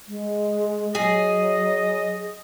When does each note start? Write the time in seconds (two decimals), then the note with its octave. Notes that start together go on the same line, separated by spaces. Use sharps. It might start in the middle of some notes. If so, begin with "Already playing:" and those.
0.08 G#3
0.95 F#3 G#4 D#5